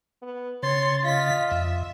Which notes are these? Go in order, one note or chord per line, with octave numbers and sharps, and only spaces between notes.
B3
C#3 C#5 C6 A6
F4 D#5 B6
F2 E5